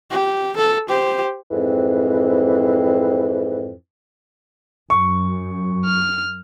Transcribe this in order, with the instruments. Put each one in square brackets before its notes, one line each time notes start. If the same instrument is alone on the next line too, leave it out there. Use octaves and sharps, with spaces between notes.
[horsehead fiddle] G4
A4
G4 C5
[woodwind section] F2 G#2 E3 C4
[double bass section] F#2 [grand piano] C#6
[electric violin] F6